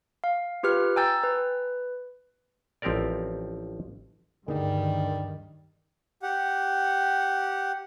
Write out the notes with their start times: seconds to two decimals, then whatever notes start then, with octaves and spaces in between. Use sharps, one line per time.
0.24 F5
0.63 F4 G4 B4 F6
0.96 G5 G#5 A#5 E6 G6 A6
1.24 B4
2.82 A1 F3 C4 G4 A#4 D5
4.48 D2 G2 D3 D#3 G3 D#4 G#4 A#4
6.23 G4 F#5